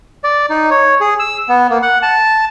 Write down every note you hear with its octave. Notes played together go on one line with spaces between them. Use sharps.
D5
D#4
C#5
G#4
E6
B3
A#3
F#5
A5